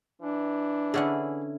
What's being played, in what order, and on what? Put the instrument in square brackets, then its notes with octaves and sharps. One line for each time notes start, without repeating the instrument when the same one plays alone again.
[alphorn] E3 [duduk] D4
[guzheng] D3 C#4 E4 [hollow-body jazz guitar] G#4 D5 F#5